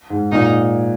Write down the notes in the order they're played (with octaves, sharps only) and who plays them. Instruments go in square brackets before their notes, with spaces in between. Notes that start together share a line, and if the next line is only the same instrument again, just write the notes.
[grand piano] G#2
[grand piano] A#2 [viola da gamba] D#4